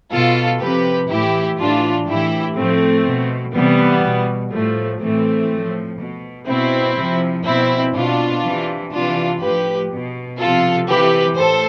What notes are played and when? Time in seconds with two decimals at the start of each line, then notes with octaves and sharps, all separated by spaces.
0.12 B2 F4 A4
0.61 C3 F3 G4 B4
1.10 A2 E3 E4 G4
1.58 A2 E3 D4 F4
2.07 A2 E3 E4 G4
2.56 A2 F3 A3 C4
3.06 B2
3.54 C3 E3 G3 B3
4.03 B2
4.53 A2 F3 A3
5.01 A2 E3 A3 C4
5.50 A2 F3
6.00 B2
6.47 B2 C4 E4
6.97 C3 F3
7.45 B2 C4 E4
7.94 B2 D4 F4
8.44 C3 E3
8.92 C3 E3 D4 F4
9.41 A2 F3 G4 B4
9.90 B2
10.39 C3 F3 F4 A4
10.88 C3 E3 G4 B4
11.37 A2 A4 C5